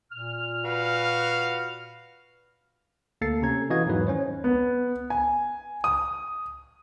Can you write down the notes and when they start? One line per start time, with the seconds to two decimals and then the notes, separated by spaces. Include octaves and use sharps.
0.11 A#2 F6
0.63 F#4 B4 F5
3.21 D2 A#3 A4 A6 C7 C#7
3.42 C3 C#4 A#5 G#6
3.70 E3 F#4 D#5 F5 D#6 G#6
3.86 E2 G#2 D#3 F#3 B4
4.07 C#4 C5 C#5
4.44 B3
5.10 G#5
5.84 D#6